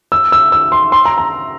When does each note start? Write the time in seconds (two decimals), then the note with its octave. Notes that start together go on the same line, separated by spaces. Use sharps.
0.12 E6
0.32 E6
0.52 E6
0.72 C6
0.92 C6
1.05 A#5
1.18 A#5